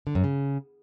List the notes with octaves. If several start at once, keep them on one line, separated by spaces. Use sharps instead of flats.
D3
F#2
C#3